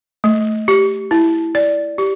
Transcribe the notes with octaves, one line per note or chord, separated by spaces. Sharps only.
A3
G4
E4
D5
G4